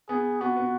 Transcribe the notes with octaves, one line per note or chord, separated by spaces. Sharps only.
B3 G#4
B3 F#4
B3